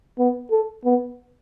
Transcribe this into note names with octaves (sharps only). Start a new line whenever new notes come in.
B3
A4
B3